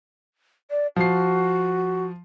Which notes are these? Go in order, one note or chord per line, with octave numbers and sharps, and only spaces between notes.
D5
F3 F#4 C7